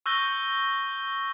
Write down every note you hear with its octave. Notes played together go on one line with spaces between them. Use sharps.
C#6 E6 F#6 G6 A#6 G7